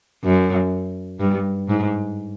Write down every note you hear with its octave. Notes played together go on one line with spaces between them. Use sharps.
F#2
G2
G#2